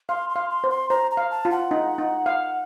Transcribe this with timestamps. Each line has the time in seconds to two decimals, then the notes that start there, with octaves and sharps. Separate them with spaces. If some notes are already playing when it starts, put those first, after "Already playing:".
0.09 F5 C6
0.29 C6
0.36 F5
0.50 C6
0.64 C5
0.70 C6
0.90 C5 A#5
1.11 A#5
1.17 F5
1.31 A5
1.45 F4
1.51 F#5
1.71 D#4
1.98 D#4
2.26 F5